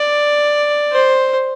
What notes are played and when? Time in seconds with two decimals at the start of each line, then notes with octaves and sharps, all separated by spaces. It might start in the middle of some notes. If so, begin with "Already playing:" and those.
Already playing: D5
0.93 C5